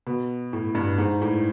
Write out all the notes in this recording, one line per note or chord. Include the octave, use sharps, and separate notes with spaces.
B2
A2
G2
G#2
A2